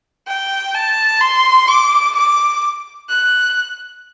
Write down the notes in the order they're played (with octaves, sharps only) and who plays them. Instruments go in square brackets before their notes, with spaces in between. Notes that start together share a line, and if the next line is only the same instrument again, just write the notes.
[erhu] G5
A5
C6
D6
D6
F#6